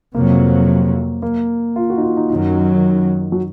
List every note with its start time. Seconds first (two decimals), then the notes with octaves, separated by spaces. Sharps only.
0.14 F2 C3 F#3 A#3
1.22 A#3
1.76 F4
1.90 F#4
1.98 D#4
2.03 F4
2.17 D#4
2.30 F#2 D#3 F#3 D#4
3.32 F#3